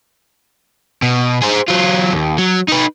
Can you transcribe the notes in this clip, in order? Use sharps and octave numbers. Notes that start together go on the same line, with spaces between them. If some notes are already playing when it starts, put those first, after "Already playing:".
B2
G#4 C5
F#3 F4
D#2
F#3
D#4 B4